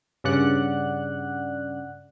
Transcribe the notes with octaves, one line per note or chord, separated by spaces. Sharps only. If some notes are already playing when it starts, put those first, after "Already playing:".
G2 C#3 D5 F#5 F#6